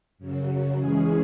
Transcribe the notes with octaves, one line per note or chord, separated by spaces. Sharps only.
F#2 C#3 F#3
E3 G#3 C#4 G#4